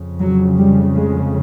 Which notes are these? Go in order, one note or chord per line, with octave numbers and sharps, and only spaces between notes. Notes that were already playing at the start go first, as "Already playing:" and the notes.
Already playing: F2 C#3
F#3
G3
G#3